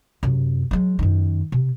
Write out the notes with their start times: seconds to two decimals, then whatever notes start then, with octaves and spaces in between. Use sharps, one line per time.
0.23 F#2 C3
0.71 F#3 G#3
0.99 F#2 D#3
1.52 C3